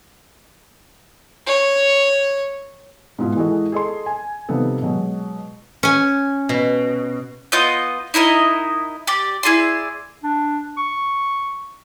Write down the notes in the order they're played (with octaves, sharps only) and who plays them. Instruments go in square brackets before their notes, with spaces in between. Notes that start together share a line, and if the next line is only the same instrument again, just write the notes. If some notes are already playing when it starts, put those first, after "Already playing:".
[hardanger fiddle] C#5
[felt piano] G#2 B2 B3 E4 F4
E3 G#3 E4 F#4 A4 D#5
G#4 A4 D#5 C6
G#5
C3 F3 G3 B3 D#4 A4
B2 F#3 G#3
[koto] C#4 G#5
[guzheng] B2
[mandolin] B3 F4 D#5 G6
D#4 E4 A#4 D#5
G4 D5
E4 G#4 D5 C6
[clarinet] D4
C#6